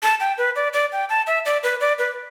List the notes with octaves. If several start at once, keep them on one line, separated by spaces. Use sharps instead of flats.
A5
G5
B4
D5
D5
G5
A5
E5
D5
B4
D5
B4